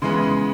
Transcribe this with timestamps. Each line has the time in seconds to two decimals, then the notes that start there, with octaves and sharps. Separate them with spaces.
0.02 C#3 E3 G#3 B3 C6
0.11 B5
0.22 C6